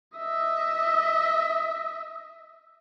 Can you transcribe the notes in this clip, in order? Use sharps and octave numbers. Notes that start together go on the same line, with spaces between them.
D#5 E5